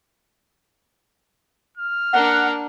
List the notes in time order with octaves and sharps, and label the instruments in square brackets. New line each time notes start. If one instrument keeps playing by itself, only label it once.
[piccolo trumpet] F6
[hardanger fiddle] A#3 D4 [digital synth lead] F#5